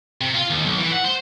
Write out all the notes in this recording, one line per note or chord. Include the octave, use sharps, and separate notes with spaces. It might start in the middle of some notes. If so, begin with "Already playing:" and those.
C3
F4
D#2
B1
E3
F#5
C5